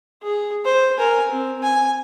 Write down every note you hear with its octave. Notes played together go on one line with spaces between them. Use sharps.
G#4
C5
A#4 G#5
C4
G#5